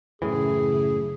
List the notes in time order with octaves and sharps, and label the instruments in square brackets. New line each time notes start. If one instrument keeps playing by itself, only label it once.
[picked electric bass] F#2 A2 E3 [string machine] C#3 E4 [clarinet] G#4